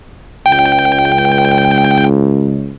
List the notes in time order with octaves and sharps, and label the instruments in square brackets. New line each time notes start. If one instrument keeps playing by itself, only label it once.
[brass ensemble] C#2 [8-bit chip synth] G5